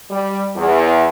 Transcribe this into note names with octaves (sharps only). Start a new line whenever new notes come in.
G3
E2